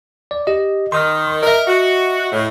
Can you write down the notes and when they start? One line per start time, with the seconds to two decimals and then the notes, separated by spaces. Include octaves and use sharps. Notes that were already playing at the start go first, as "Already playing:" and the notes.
0.31 D5
0.47 G4 D#5
0.92 D#3 C6 D#6 F6
1.43 A#4 D#5 E5
1.67 F#4
2.33 A2